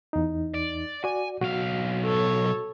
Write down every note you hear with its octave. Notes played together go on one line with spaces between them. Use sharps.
E2 D#4
D5
F#4 D5 G#5
B1 F#4 F5
A4 C#5